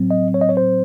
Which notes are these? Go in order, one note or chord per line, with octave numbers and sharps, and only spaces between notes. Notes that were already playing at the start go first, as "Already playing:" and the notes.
Already playing: A2 F#3 C4
D#5
C#5
D#5
C#5
C5